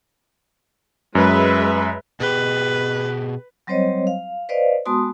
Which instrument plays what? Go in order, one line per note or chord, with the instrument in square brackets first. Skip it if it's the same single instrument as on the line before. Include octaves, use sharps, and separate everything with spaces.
[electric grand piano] F#2 [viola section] G#3 B4 E5
[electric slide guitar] B2 G4 [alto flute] G#4 [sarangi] B4
[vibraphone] F#3 G3 C4 C5 C#5 D#5
F5
B4 C5 D5 D#5 F5
G#3 B3 F#4 A5 C6 D#6